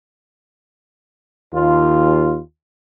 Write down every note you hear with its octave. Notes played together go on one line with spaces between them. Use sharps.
D#2 F4